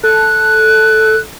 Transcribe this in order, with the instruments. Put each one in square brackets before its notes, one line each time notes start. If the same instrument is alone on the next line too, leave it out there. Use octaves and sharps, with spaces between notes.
[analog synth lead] A4 [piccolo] F#6